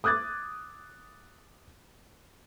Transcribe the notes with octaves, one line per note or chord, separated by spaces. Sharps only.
D6 D#6 F#6 G#6 A6